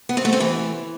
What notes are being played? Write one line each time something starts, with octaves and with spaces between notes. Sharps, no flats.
B3
C4
A3
C4
E3